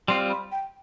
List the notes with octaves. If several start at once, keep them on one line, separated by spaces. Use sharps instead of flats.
G3 C4 F4 C6
B5
G5